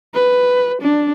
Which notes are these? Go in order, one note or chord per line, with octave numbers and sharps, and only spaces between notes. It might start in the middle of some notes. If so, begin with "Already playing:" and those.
B4
D4